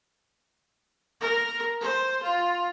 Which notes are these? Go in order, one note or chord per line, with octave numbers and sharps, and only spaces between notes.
A#4
C5
F4